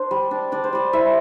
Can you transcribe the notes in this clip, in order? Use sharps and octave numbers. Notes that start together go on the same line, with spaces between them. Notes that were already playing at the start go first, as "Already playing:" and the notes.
Already playing: D4 C5
G3
D4
D4 D5
C5
G3 D5
E4 E5